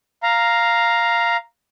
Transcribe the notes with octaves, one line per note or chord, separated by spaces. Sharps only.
F5 A#5